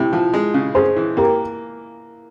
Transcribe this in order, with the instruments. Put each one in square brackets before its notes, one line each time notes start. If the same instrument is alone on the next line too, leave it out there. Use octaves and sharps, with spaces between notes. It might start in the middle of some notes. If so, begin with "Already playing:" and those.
Already playing: [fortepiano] C3 [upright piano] E4 G4
[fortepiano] F3
G#3
C#3
[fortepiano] C#4 [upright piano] G#4 C5
[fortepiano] E3
[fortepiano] A#3 [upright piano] G4 A#4